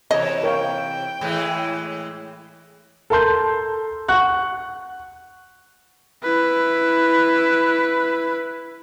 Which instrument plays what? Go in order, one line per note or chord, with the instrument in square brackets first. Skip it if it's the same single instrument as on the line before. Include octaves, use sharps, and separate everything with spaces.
[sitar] C3 E3 [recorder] C#5 [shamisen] D#5 [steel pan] A5
[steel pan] A#4 C#5 F5 [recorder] G5
[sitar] A2 E3 G#3
[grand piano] A4 A#4 A5 C6 G6
F#5 C#6 F#6
[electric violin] E4 B4